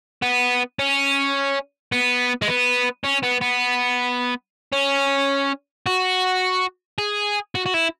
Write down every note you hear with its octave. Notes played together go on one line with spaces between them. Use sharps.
B3
C#4
B3
G#3
B3
C#4
B3
B3
C#4
F#4
G#4
F#4
F#4
E4